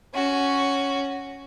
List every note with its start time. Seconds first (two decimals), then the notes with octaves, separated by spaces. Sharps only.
0.14 C#4 F#4